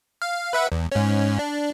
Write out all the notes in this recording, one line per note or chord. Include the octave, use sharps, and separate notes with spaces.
F5
B4 E5 F#5
E2
G#2 C#4
D4